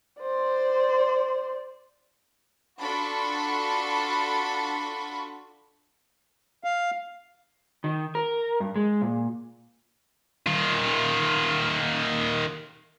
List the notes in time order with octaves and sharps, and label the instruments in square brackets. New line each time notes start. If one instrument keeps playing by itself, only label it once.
[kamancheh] C5 D5
[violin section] D4 F4 F#4 A4 B5 C#6
[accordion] F5
[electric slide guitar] D#3
A#4
G2
G#3
A#2
[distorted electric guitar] D#3 F4